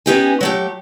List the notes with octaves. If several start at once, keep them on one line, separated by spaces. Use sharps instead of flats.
B3 C#4 D#4 G4 A#4 G#5
F#3 A3 G4